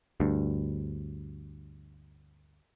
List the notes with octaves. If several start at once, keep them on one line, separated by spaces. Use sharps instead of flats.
D2 G2